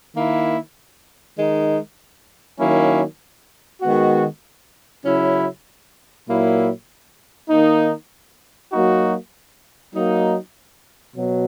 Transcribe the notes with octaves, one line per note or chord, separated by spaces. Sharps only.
D#3 A#3 E4
D#3 G#3 D#4
D#3 F#3 A#3 C#4 E4
D#3 G#3 B3 F#4
C#3 F#3 C#4 E4
A#2 F#3 A#3 E4
D#3 A#3 D#4
F#3 A#3 D#4 F#4
F#3 A#3 D#4
B2 F#3